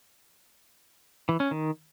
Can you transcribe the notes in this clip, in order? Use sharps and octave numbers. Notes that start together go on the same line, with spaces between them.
E3
C#4
D#3